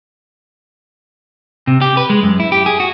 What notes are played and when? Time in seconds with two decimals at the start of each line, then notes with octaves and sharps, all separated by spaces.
1.67 C3
1.81 G4
1.97 B4
2.10 G#3
2.23 F#2
2.40 E4
2.52 G4
2.66 G#4
2.80 F#4